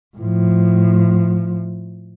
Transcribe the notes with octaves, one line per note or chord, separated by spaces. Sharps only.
A2 F3